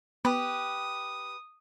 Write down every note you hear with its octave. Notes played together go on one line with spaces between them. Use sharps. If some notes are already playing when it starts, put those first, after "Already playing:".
B3 G4 B4 D#6